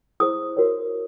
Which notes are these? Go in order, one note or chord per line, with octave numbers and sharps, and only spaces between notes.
E4 G#4 C5 D#6
F#4 A#4 C#5